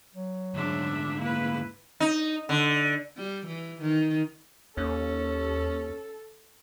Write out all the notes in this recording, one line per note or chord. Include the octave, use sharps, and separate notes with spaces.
F#3
D2 G#2 D4 E5
A#3 E4 B4
D#4
D3
G3
E3
D#3
D#2 C#4 A4